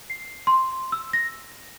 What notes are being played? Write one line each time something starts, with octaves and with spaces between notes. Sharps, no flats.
C7
C6
E6
A#6